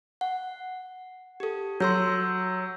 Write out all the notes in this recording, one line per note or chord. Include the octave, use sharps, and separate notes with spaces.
F#5
G4 A4
F#3 C6 E6 G6